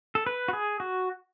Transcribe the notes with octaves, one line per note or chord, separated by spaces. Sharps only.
A4
B4
F#4
G#4
F#4